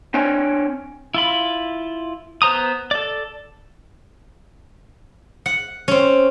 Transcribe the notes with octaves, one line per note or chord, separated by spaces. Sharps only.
C4 D4 C#5 G5 G#5
E4 F4 B5
B3 B4 C5 A#5 D#6
A4 D5
F#5
C4 C#4